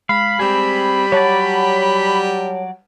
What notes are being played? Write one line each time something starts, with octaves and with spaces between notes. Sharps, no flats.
G#3 F5 B5
G3 C4 G#4
F#3 C#5 D5 F#5 A5